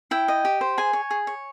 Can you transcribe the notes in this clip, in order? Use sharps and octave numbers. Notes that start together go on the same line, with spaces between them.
E4 G5
D#5
G4
C5
G#4 G#5
C#5
G#4
C#5